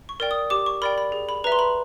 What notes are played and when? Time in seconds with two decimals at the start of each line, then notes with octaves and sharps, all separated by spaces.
0.09 C#6
0.20 A#4 D5 G5
0.31 D#6
0.50 G4 D6
0.66 C#6
0.82 A#4 D5 G5 B5
0.98 B5
1.12 G#4
1.29 B5
1.44 B4 E5 A#5
1.52 C6
1.59 B5